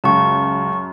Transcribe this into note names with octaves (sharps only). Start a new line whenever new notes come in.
C#2 F#2 A5 C#6